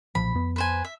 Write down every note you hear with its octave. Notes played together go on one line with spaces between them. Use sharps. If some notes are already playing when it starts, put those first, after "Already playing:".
B1 A#2 F3 B5
F2 B3
B4 C5 G#5
E5